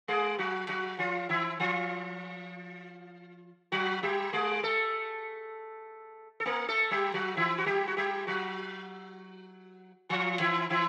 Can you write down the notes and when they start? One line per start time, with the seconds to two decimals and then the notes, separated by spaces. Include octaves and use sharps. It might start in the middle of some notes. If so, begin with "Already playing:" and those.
0.08 G#3 G#4
0.39 F#3 F#4
0.69 F#3 F#4
0.99 F3 F4
1.29 E3 E4
1.60 F3 F4
3.72 F#3 F#4
4.03 G3 G4
4.33 G#3 G#4
4.63 A3 A4
6.40 A4
6.45 A#3 A#4
6.68 A3 A4
6.91 G3 G4
7.14 F#3 F#4
7.37 E3 E4
7.58 F#4
7.66 G3 G4
7.87 F#4
7.97 G3 G4
8.27 F#3 F#4
10.09 F3 F4
10.40 E3 E4
10.70 E3 E4